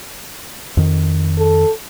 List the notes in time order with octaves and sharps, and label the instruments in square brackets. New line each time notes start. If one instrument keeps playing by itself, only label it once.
[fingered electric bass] F2 D#3
[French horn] A4